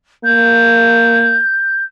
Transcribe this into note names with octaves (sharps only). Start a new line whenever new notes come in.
A#3 G6